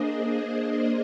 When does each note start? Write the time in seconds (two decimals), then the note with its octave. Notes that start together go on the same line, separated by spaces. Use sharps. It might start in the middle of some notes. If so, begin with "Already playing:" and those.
Already playing: A#3 D4 G#4 C5 D#5